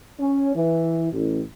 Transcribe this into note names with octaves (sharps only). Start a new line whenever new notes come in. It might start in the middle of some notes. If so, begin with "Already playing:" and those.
C#4
E3
A1